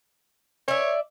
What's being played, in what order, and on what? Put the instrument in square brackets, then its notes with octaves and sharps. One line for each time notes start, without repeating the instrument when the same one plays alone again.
[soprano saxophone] C#5 [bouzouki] D5 E5